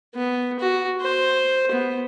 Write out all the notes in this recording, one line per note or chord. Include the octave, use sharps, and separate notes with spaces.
B3
F#4
C5
B3